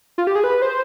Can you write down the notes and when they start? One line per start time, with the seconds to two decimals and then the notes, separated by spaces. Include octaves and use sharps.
0.18 F4
0.27 G4
0.36 G#4
0.44 B4
0.62 C5